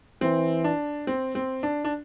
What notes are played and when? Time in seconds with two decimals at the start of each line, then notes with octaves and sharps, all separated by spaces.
0.21 E3 C4
0.64 D4
1.07 C4
1.35 C4
1.63 D4
1.85 D4